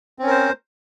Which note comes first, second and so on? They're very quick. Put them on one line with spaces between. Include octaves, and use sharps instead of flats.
C4 C#4 A#4 C5